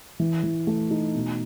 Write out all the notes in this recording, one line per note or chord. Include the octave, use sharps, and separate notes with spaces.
E3
E3
A3
D#4
B2